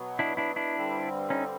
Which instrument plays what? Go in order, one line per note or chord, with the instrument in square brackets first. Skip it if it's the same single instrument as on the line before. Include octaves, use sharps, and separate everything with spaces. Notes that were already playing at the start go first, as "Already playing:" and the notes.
Already playing: [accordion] B2 F#3 B3
[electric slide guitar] D4 E4
D4 E4
D4 E4
[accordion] G2 D3 G3 C4
[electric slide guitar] C#4 D#4